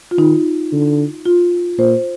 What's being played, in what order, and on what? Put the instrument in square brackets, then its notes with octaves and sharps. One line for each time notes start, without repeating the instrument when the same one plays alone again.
[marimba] F4
[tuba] D#3 [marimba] D#4
[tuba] D3
[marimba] F4
[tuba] A#2 [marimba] C5